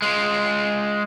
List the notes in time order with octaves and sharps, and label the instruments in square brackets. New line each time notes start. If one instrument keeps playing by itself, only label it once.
[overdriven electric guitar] G#3 F4